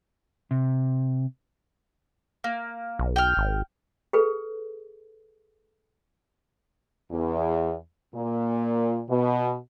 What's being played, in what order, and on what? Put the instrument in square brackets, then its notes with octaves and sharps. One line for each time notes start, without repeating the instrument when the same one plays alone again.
[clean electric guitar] C3
[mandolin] A#3
[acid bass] B1
[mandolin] G5 F6
[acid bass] G#1
[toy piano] G#4 A4 B4
[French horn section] E2
A#2
B2